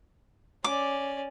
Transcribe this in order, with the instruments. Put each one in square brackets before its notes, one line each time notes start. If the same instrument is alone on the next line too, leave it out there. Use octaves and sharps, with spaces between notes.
[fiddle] C#4 D5 [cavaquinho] D6